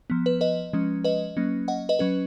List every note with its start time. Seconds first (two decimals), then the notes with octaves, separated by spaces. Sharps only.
0.10 F3 B3
0.26 B4
0.41 B4 D#5
0.73 F3 G#3 C#4
1.04 B4 D#5
1.37 F#3 A#3 C#4
1.68 D#5 F#5
1.89 B4 D#5
1.99 F#3 C#4 B4